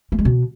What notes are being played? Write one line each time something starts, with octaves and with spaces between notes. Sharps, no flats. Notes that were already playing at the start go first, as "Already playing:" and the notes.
A3
G#3
B2